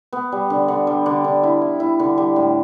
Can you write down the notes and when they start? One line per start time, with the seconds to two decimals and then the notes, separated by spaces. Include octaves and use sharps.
0.13 B3
0.32 G3
0.50 D3
0.68 D3
0.87 G3
1.06 D3
1.24 D3
1.43 E4
1.61 E4
1.80 E4
2.00 D3
2.18 G3
2.36 A2